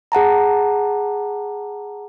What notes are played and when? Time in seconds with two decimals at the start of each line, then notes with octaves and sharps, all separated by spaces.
0.12 G#4 F#5 A5 A#5